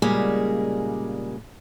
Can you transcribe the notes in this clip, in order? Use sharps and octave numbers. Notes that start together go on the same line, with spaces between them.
A#2 C#3 G3 G#3 A#3 G#4